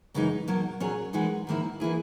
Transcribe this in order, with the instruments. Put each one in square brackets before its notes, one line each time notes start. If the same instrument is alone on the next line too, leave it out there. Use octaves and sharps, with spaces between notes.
[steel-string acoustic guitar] F#2 C#3 E3 G#3 D#4
B2 F#3 A#3
A#2 F#3 C#4 G#4 C#5
E3 G#3 D#4 F#4
G#2 D#3 A#3 E4
E3 A#3 E4 G#4